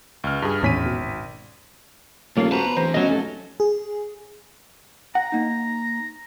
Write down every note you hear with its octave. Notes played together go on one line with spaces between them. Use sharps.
C#2 F6
G2 G#4
G#1 E2 A2 C#4 B6 D#7
B2
D#1 F3 A3 A#3 F4 C#5 C7
F#4 B4 C5 A5 A#5
B2
D1 E3 C5 A#5
B2 F#3 A3 C#4 D#5
F1 F#3 A4
G#4
F#5 A#5
A#3 D#4